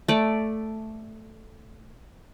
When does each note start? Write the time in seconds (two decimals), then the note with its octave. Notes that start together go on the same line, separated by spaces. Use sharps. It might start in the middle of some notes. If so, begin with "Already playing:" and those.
0.08 A3 D5